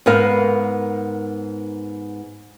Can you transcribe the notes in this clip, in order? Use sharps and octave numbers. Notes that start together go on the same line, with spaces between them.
G#2 B3 A#4 B4 F5